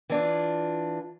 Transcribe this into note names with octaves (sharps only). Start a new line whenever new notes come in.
E3 D4 F4